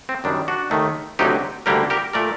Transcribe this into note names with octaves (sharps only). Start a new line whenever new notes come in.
C4
F#2 D#3 G3 D4
D4 F#4
D#2 D#3 A3
D2 C3 F#3 D#4 G4
D2 D3 G3 A#3 G4 A#4
G4 A#4
A#2 A3 A#4 D5